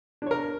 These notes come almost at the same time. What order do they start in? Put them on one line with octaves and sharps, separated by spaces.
D4 C#5 A#4